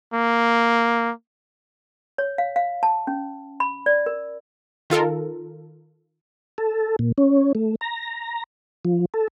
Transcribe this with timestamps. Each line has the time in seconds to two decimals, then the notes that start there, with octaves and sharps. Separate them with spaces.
0.13 A#3
2.18 C#5
2.38 F5
2.56 F5
2.83 A5
3.07 C#4
3.60 B5
3.86 D5
4.06 A#4
4.90 D#3 F4 A4 A#4
6.58 A4
6.99 A#2
7.18 C#4
7.55 A3
7.81 A#5
8.85 F3
9.14 A4